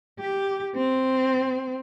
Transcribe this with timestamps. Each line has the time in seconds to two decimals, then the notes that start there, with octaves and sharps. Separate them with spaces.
0.20 G4
0.75 C4